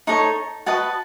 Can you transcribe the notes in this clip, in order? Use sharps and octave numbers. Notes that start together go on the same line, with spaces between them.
D#4 A4 C#5 C#6
F#4 B4 D#5 A5